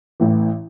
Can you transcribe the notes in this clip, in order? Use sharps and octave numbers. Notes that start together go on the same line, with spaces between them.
A1 A2 E3